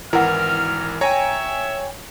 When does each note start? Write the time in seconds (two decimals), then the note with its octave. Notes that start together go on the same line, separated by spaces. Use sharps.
0.13 G#1 E3 E4 A#4 F#5 F6
1.01 C#5 E5 G5 G#5 A#5